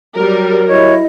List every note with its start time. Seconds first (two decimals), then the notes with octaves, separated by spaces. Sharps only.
0.16 F#3 G3 A#4
0.69 E4 C#5 D#5